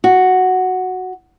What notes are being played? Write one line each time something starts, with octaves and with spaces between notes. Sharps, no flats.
F#4